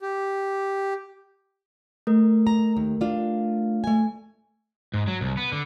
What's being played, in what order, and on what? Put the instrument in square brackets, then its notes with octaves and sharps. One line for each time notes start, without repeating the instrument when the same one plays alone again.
[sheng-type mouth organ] G4
[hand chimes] A3 A#4
[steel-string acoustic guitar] A#5
D#2
D4 F4
A3 G#5
[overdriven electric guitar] G#2
F#3
C2
B3
D3